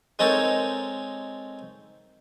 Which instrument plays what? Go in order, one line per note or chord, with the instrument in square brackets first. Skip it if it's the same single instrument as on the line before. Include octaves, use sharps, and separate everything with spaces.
[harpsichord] G#3 C4 D#4 A4 A#4 C#5